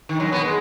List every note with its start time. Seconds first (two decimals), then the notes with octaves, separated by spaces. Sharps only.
0.09 D#3
0.20 F#2 F#3
0.32 B2 B3
0.45 G#3